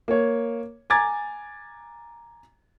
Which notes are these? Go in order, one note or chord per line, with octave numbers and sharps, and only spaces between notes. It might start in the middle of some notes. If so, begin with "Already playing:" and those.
A#3 C#5
G#5 A#5 D6 G#6 A6